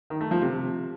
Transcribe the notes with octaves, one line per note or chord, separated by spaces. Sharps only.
D#3
A3
F3
C3